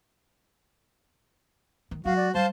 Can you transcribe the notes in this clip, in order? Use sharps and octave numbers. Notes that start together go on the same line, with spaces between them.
D#3
F#3 G#3 F#4 F5
D5
G3 C5 F5 A5 C6